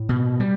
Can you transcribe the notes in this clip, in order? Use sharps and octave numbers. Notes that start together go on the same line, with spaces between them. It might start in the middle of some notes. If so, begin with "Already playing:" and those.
Already playing: A2
B2
G3